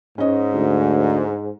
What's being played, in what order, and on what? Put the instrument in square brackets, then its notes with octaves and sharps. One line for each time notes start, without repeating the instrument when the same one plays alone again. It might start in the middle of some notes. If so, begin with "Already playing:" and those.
[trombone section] G#2 [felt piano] C#4 D#5
[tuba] D2